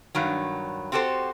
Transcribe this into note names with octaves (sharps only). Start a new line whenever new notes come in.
G2 D#3 F#3
C4 F#4 G4 A4 C5